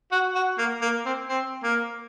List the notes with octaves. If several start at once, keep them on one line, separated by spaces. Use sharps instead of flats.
F#4
F#4
A#3
A#3
C4
C4
A#3